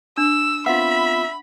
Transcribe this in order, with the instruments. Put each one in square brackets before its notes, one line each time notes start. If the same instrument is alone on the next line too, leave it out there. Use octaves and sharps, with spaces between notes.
[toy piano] D4 [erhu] E6
[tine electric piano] B3 C4 F4 [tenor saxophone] E5 [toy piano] F#5 [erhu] B5